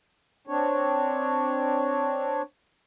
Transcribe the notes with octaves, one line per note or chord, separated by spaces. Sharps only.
C4 D4 C#5